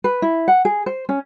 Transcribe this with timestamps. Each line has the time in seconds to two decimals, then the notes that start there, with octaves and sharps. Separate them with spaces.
0.04 B4
0.22 E4
0.48 F#5
0.65 G#4
0.86 C5
1.09 C#4